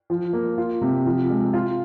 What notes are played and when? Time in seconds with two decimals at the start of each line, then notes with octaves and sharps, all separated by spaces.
0.10 F3
0.33 A#3
0.58 F4
0.81 C3
1.06 F3
1.30 G#3
1.53 F4